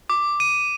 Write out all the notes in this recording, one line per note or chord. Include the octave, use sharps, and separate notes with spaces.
D6
D#7